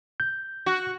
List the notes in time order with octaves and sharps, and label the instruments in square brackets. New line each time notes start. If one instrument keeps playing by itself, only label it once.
[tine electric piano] G6
[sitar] F#4